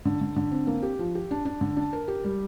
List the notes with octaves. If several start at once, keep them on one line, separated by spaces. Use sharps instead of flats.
D3
D3
D3
C4
A#3
G4
F3
G4
D4
D4
D3
D4
A#4
G4
G3